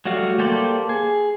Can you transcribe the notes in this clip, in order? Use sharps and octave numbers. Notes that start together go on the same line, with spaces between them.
F#3 G3 A3 F#4 F5
A#3 G4 A4 C5 D5
G#4